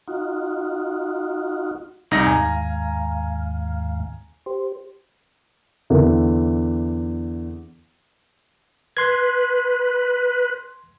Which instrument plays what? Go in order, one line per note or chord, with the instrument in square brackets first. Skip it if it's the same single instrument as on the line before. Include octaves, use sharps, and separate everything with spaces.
[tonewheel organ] D#4 F4 F#4
[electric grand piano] C2 D#4 A#6
[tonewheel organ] D#2 G#2 F5 [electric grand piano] G#5 A#5
[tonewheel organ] G4 C5
[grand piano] E2 D3
[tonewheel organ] B4 [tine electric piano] C6 G#6